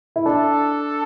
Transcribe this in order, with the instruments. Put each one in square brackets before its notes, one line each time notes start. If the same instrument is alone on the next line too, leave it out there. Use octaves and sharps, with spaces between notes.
[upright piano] E4
[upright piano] D4 [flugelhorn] A4